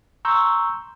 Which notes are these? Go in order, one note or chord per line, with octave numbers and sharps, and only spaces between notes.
A#5 C6 C#6 E6 G6